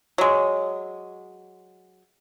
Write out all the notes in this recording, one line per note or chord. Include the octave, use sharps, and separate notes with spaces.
F#3 G#3